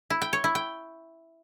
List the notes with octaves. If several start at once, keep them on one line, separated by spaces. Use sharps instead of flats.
E4
G5
C#5
E4
G5